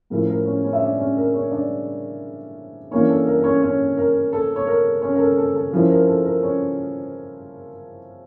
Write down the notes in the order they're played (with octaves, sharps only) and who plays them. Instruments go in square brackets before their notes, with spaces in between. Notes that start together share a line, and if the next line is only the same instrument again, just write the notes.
[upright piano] A2 F3 C#4 E4 A#4
A#4
C#4 C#5
C#4 C#5
E5
D4 D5
C#4 C#5
A#4
C#4 C#5
D4 D5
E3 A#3 C#4 D4 C#5
A4
A#4
A#4
C#4 C#5
C#4 C#5
A#4
A4
C#5
A#4
C#4 C#5
A#4
A4
A4
A4
F3 C#4 E4 A#4
A#4
A4
A#4
C#4 C#5